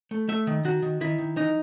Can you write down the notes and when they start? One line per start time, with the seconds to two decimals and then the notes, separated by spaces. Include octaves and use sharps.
0.11 A3
0.29 A3 E5
0.47 D#3
0.64 D#3 F#4
0.82 D#3
1.01 D#3 E4
1.18 D#3
1.36 E3 D#4